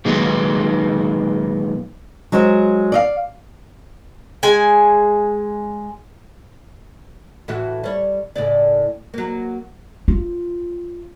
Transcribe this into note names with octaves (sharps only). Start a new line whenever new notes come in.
A#2 D#3 F#3 G#3 B3 D#4
F#3 G#3 F#4 C5
D5 D#5 F5
G#3 G#5
A2 E3 F#4
G3 C#5
A2 C#3 D5
F#3 A#3
F4